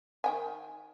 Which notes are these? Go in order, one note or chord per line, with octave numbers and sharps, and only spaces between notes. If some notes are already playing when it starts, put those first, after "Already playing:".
D#3 G5 G#5